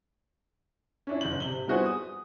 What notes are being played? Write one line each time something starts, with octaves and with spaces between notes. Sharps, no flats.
C#4 D4 E4
F#1 G6 F#7
C3 F#7 G7
G3 B3 E4 F#4 G#4 C5
D#6